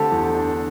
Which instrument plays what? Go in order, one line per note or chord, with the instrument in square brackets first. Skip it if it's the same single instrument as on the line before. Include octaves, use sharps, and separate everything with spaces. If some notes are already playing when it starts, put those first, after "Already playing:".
Already playing: [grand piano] D3 A3 C4 G4 A4 A5
E2
D4